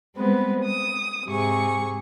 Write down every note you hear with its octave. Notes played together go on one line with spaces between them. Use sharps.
G3 G#3 B3 C4 B4
D#6
G#2 C3 G#4 C#6